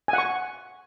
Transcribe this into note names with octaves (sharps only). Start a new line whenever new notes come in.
G#5
F#5
C#6